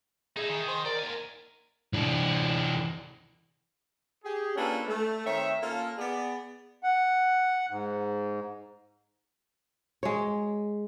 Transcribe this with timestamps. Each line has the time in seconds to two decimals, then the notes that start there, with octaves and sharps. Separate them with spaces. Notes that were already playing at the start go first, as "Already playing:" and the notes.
0.37 D#4 E4 G#4
0.49 D#3
0.68 C5
0.86 A#4 D5
0.99 D#2 G#5
1.93 E3 D4
4.24 G4 G#4
4.56 A#3 C#4 D4 F4 A4 B4
4.87 A3
5.25 D#3 C4 C#5 E5
5.61 A#3 C#4 F4 A4
5.97 B3 G#4 D5
6.83 F#5
7.70 G#2
10.03 G#3 C#5